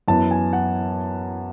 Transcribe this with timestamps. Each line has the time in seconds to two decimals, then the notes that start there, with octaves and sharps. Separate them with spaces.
0.08 F#2 E3 B3 A5
0.31 G#5
0.53 F#5